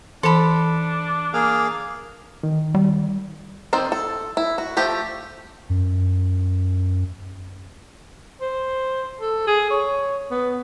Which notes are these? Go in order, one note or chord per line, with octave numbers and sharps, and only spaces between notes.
E3 D4 A4 A5 B5
A#3 G#4 F5
D#3
G3
D#3 C4 C5 D5
A4
E4
F#4
F3 A3 G4
F#2
C5
A4
G#4
C#5
B3